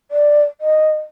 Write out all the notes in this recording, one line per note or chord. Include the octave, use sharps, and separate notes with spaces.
D5
D#5